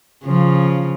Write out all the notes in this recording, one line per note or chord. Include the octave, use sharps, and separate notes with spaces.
C#3 F3